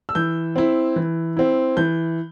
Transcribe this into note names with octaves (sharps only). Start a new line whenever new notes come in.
E6
E3 G6
C4 E4
E3
C4 E4
E3 G6